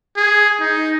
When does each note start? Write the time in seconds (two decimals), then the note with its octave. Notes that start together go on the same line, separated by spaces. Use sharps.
0.17 G#4
0.60 D#4